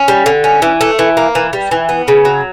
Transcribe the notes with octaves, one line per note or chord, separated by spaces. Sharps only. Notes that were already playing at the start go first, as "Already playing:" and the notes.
Already playing: C#4
G3
D3
C#4
E3
A3
E3
A#3
E3
G3
E3
B3
C#3
F#3